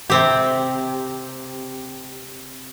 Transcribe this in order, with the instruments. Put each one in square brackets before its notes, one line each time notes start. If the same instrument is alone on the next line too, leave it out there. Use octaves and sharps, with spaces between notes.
[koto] C3 C4 G4